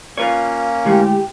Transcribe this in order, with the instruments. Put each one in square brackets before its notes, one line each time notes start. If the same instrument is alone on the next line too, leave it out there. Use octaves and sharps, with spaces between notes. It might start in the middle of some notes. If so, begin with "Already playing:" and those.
[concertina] A#3 C#4 [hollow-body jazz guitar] F4 B4 C#5
[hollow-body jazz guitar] D3 G#3 A3 [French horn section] E4 G4